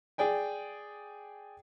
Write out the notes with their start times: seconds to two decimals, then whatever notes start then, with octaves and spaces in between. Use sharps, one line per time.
0.18 G#4 D5 G5 G#5